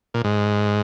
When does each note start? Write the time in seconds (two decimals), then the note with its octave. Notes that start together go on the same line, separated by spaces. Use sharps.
0.14 A#2
0.24 G#2